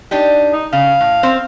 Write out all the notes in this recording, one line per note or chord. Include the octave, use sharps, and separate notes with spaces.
D4 D#4 G4
D#4
C#3 F5
A2
C4 C5